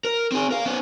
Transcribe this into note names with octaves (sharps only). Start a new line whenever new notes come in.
A#4
C4 G#4
A#4 F5
B3 C#4